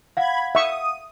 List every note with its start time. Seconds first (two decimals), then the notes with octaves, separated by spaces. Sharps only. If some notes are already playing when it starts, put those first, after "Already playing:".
0.17 F5 F#5 B5 G#6
0.55 E5 C#6 D#6